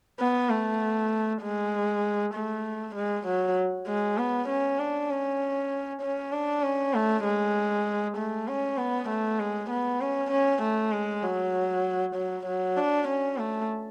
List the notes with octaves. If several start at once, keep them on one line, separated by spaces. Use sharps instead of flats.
B3
A3
G#3
A3
G#3
F#3
G#3
B3
C#4
D4
C#4
C#4
D4
C#4
A3
G#3
A3
C#4
B3
A3
G#3
B3
C#4
C#4
A3
G#3
F#3
F#3
F#3
D4
C#4
A3